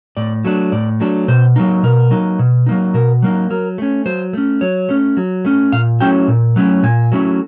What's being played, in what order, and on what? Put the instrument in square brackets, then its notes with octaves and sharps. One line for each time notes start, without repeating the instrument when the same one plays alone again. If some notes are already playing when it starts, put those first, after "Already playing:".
[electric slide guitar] A2 D5
F#3 A3 D4
A2 D5
F#3 A3 D4
B2 C5
F#3 A#3 D#4
B2 A#4
F#3 A#3 D#4
B2
F#3 A#3 D#4
B2 A#4
F#3 A#3 D#4
F#3 A#4
A3 C#4
F#3 C5
A3 C#4
F#3 C#5
A3 C#4
F#3
A3 C#4
A#2 F5
F#3 A3 C#4 E4 G5
A#2
F#3 A3 C#4 E4
A#2 G#5
F#3 A3 C#4 E4